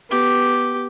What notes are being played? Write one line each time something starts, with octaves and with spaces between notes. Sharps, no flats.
B3 G4